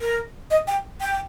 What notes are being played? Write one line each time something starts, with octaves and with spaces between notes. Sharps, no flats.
A#4
D#5
G5
G5